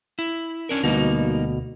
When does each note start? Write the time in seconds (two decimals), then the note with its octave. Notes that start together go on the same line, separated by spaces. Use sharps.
0.19 E4
0.69 C#4 D4 A#4
0.83 D2 B2 G3 A#3 D#4